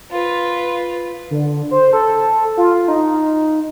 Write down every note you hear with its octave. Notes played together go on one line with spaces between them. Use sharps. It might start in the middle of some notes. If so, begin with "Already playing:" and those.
F4 B4
D3
C5
A4
F4
D#4